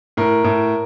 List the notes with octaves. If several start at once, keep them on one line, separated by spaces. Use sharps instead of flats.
A2 A#4
A2